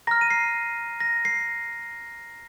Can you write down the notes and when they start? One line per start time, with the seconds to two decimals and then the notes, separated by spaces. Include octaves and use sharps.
0.07 A#5 F6 A#6
0.21 D#7
0.30 C7
1.00 A#6
1.25 C7